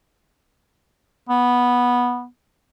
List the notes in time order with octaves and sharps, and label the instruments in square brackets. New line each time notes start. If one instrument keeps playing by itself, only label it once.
[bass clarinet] B3